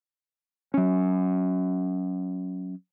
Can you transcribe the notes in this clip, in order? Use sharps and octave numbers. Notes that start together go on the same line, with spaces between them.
F#3 C#4